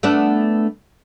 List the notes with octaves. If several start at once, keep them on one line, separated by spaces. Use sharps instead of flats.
A3 B3 D4